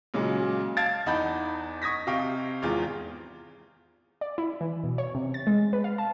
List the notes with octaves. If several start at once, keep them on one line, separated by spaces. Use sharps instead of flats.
A#2 C#3 F#3 G#3
F5 A5 G#6 A6 D7
E2 D#4 F#5 A5 B5 G6
C#6 D#6 G#6 A#6 B6
C3 D#5 F5 G5 C#6
G#1 E2 F4 G#4
D5
E4
E3
B2
C#5
C3
A6
G#3
B4
F5
A5